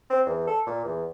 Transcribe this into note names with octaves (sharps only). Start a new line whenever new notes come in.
C4
E2
A4
A#2
E2